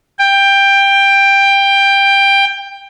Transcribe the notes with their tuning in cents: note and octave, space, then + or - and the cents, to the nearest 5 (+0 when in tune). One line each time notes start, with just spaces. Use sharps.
G5 +15